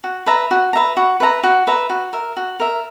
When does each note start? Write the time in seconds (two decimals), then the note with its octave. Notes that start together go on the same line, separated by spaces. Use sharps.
0.04 F#4
0.26 B4 E5 A#5
0.51 F#4
0.73 B4 E5 A#5
0.97 F#4
1.20 B4 E5 A#5
1.43 F#4
1.67 B4 E5 A#5
1.90 F#4
2.13 A#4 E5
2.37 F#4
2.60 A#4 E5